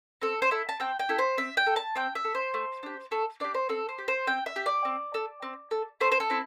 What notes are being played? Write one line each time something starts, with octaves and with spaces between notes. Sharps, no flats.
C4 A4
C5
E4 A4
A5
C4 G5
G5
E4 A4
C5
C4 E5
G5
A4
A5
C4 G5
E5
A4
C5
A3
D4 G4
A3 A4
D4 G4 D5
C5
C4 A4
C5
G4
C5
C4 G5
E5
G4
D5
C4
A4
C4
A4
A3 C5
C5
A4
C4 E4